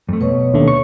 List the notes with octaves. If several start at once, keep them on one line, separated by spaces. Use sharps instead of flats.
F2 A3
B2 B4 C#5
D#2 D3 A3
C#6